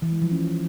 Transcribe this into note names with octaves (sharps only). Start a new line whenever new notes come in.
E3
G#3
F3
C#4